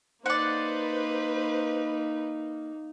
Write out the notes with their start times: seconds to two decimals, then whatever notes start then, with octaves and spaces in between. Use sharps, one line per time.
0.26 A#3 D#4 B4 C5 D5 F#5